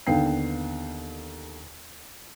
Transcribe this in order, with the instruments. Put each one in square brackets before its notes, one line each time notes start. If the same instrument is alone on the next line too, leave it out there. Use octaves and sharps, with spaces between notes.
[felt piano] D#2 D3 B3 G5 C7